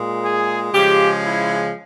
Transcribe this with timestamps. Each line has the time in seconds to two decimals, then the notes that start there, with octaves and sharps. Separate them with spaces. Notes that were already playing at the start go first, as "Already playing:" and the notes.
Already playing: A#2 G#3
0.23 G#4
0.73 C#3 F3 G#3 G4
1.24 E4